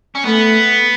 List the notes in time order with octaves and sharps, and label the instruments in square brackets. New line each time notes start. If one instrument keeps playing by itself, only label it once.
[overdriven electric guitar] C#4
[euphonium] A3 [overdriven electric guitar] B3